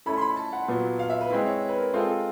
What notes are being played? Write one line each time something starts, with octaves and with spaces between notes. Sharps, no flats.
A3 C#4 E4 A4 B5
C6
B5
A5
F#5
A#2 F#3 B3
F5
E5
B4
G#3 C4 E4
C#5
B4
A#4
G#3 C4 F4 A4
A4